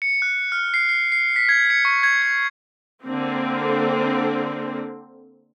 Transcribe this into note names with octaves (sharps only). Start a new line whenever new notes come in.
C#7
F#6
F6
C7
C7
C7
B6
G#6
C#7
C#6
G#6
G#6
D3 A#3 C4